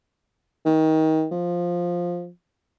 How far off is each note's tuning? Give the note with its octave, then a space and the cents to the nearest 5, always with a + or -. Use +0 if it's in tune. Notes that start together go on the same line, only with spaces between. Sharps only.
D#3 +25
F3 +5